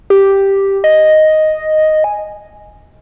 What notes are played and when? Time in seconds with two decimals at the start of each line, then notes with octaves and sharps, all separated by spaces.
0.10 G4
0.84 D#5
2.04 G#5